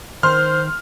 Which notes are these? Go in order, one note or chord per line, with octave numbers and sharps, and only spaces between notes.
D#3 C5 C6 F6